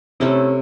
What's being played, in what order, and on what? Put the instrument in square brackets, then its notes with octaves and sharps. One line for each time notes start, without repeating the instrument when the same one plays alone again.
[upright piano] C3 [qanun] A3 C#4 E4 A4